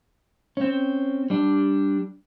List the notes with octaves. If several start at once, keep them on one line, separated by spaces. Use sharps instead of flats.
C4 C#4
G3 D4